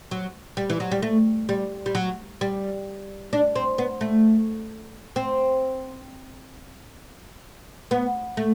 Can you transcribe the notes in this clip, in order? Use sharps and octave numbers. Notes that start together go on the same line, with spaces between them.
F#3
G3
E3
F#3
G3
A3
G3
G3
F#3
G3
D4
C4
B3
A3
C4
B3
A3